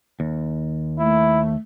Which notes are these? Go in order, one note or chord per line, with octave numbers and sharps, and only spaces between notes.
D#2
A3 E4